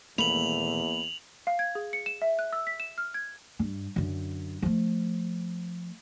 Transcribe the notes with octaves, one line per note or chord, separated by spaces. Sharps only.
D#1 E2 A3 A#3 B5 F7 F#7
F5
G#6
G#4
C#7
E7
E5
F#6
E6
B6
E7
F6
G#6
G2
F#2 D3
F3 A3